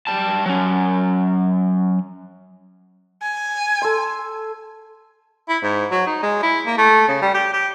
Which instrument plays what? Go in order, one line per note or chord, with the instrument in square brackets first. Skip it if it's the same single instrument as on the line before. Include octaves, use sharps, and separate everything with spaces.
[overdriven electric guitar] G3 A5
F#3 C#4
[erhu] G#5
[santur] A4 C6
[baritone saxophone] E4
G#2
F#3
D#4
G#3
E4
A#3
A3
C#3
G3
G4
G4